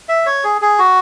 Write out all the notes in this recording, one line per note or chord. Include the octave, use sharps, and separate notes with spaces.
E5
C#5
G#4
G#4
F#4